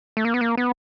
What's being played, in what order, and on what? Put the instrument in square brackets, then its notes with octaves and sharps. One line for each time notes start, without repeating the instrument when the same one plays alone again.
[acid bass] A3
A#3
B3
A#3
B3